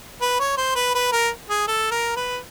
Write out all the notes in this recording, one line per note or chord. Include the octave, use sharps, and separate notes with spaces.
B4
C#5
C5
B4
B4
A#4
G#4
A4
A#4
B4